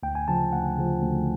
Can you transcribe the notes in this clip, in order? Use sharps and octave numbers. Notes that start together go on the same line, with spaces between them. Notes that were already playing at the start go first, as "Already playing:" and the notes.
D2 G5
G#5
C#3 F3 A5
D2 F#5
C#3 F3
D2